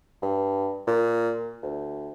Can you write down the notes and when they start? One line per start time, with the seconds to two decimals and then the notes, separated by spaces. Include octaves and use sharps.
0.22 G2
0.87 A#2
1.63 D2